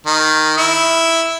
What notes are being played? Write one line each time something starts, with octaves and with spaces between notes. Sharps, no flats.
D#3
E4